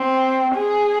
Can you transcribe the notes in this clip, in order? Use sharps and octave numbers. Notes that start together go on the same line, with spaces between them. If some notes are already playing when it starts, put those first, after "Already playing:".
Already playing: C4
G#4